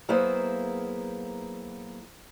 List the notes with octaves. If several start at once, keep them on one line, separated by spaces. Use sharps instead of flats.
F#3 A#3 B3 E4 G#4 C5